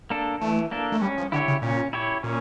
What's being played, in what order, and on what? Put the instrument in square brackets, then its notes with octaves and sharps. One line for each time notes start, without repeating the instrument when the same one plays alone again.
[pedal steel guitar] A#3 D4 A4
[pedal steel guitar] E3 [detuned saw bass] A3
[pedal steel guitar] A#3 D4 A4
[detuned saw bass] A3
[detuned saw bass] G3 [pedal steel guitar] C#4
[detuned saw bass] F3
[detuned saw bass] D3 [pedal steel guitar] E4 G4 C#5
[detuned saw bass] C#3
[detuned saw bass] A#2 [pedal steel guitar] C#4
[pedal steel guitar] E4 G4 C#5
[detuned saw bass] A#2 [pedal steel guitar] C#4